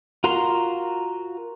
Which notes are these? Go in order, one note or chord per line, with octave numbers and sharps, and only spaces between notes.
F4 F#4 A#4 A#5 C6